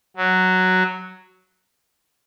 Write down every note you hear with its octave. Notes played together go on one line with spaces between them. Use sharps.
F#3